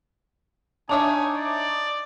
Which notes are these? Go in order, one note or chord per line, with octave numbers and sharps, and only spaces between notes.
D4 D#4 C#5 E5 G#5 A5 D6 D#6
D5